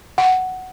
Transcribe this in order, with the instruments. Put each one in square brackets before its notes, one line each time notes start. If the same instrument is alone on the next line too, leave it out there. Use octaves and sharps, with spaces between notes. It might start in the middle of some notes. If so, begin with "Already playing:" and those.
[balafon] F#5